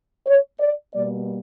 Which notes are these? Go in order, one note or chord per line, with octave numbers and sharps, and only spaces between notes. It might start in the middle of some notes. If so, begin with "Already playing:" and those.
C#5
D5
B2 G3 A#3 D5